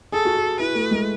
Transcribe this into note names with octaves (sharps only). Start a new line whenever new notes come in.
G#4 A4
F#4
G#4
E4 B4
A3
G#3